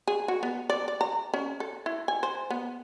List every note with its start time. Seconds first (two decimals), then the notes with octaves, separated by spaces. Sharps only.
0.07 G#4
0.28 F#4
0.43 B3
0.70 D5
0.88 D5
1.01 A#5
1.34 C#4
1.60 A4
1.86 E4
2.08 G#5
2.23 C5
2.50 B3